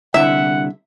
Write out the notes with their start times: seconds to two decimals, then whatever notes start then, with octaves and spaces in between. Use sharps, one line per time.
0.14 C2 D3 E4 E5 F#5